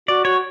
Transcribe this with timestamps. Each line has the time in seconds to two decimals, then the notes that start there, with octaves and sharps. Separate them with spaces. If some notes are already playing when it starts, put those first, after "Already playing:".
0.08 F#4 D5
0.25 F#4 C#5